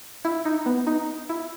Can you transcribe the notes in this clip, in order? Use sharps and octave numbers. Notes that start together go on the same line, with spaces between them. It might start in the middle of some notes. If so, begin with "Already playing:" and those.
E4
D#4
B3
D#4
E4